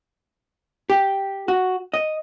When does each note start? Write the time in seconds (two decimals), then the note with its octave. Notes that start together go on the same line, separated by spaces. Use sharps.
0.90 G4
1.48 F#4
1.94 D#5